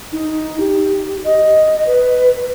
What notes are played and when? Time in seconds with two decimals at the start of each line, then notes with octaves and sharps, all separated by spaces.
0.13 D#4
0.60 G4
1.24 D#5
1.87 B4